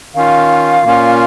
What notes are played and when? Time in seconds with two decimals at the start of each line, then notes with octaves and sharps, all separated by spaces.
0.15 D#3 C#4 F4 F5
0.84 A#2 A#3 C#4 F4